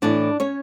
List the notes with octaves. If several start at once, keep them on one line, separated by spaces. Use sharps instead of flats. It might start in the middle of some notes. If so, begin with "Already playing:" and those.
A2 E3 D4 D5
C#4 C#5